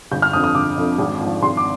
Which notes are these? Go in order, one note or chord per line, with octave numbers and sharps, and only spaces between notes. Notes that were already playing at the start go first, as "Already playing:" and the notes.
G1 G6
F6
F2 D3 F3 D#6
D#6
G1 D6
F2 D3 F3
G#1
G#2 F3
G#1 C6
D6